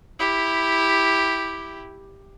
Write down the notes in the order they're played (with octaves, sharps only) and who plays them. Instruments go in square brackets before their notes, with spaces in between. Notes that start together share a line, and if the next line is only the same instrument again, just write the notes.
[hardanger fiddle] E4 G4